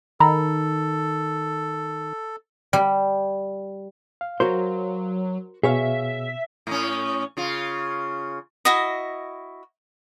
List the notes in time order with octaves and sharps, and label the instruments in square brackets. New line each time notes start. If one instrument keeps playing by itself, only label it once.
[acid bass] D#3 [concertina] A4 [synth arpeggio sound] A#5 B5
[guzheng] G3
[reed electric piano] F5
[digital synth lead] F#3 [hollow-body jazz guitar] F#4 A#4 C5
[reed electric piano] B2 [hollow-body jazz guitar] G#4 C#5 F5 [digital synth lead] E5
[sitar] A2 C#4
C#3 F4
[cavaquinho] E4 F#4 D#5